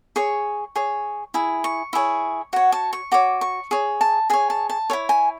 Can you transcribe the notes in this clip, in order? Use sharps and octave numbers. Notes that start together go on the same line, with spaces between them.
G#4 C#5 C#6
G#4 C#5
E4 G#4
C#6
E4 G#4 C#5
F#4 C#5 F#5
A5
C#6
F#4 C#5 D6
C#6
G#4 C#5
A5
G#4 C#5 G#5
A5
A5
E4 A4 C#5
G#5